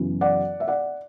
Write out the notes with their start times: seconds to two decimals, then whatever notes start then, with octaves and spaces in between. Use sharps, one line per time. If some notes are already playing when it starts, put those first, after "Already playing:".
Already playing: F#2 C#3 E3 B3
0.21 D5 F#5
0.60 E5
0.68 D5 F#5